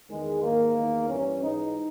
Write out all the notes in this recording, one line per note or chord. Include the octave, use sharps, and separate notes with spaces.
E2 D#3 G#3
G#2 D#3 A#3
E2 D#3
G2 E3 C#4
G#2 E3 D#4